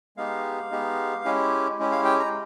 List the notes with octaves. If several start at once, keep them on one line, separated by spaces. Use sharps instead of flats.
G#3 B3 D#4 G4 F5
G#3 B3 D#4 G4
G#3 C#4 E4 G4
G#3 C#4 E4 G4
F5
G5
A#5